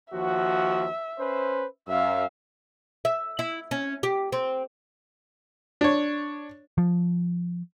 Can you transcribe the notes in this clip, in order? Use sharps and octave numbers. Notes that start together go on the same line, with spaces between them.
D#2 F3 F#4 E5
C#4 B4 C5
F#2 E5 F5
E5
E4
C#4
G4
C4
D4 C#5
F3